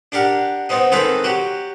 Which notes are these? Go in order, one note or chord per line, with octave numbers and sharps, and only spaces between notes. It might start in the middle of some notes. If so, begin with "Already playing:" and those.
D4 G4 A#4 F#5
B3 C4 D#4
D#3 G#3 C4 D#4 A4 B4
F#3 F#4 G4